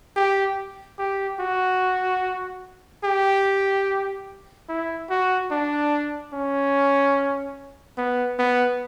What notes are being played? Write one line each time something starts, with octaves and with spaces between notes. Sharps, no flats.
G4
G4
F#4
G4
E4
F#4
D4
C#4
B3
B3